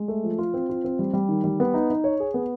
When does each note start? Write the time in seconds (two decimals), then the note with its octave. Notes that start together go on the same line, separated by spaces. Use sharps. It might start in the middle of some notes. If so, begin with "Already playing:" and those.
Already playing: G#3
0.08 A3
0.24 F3
0.38 F4
0.54 C4
0.69 F4
0.84 C4
0.99 G3
1.13 G3
1.29 D#3
1.44 G3
1.60 B3
1.74 D#4
1.90 D#4
2.04 C#5
2.20 G#4
2.34 B3